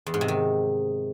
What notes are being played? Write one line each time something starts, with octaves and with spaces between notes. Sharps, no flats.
E2
G#2
C3
D#3